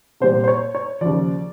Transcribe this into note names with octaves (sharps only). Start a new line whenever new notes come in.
C2 A#2 G3 C5
C5
C#5
C#5
D#2 C#3 F3 D5